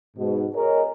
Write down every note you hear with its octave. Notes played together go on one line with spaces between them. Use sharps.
G#2 B2
G#4 A#4 C#5 D#5